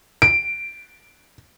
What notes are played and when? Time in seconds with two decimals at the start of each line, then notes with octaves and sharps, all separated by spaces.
0.22 D7